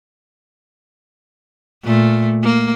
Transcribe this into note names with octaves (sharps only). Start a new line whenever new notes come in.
A#2 A3
A#3